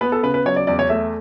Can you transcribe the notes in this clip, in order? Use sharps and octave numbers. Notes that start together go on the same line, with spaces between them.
B3 B4
A4
C#3 B4
B4
F#3 C#5
D5
E2 D5
C#5
A3 E5